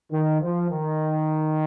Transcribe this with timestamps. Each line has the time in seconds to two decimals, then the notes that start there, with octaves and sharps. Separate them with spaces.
0.12 D#3
0.41 F3
0.70 D#3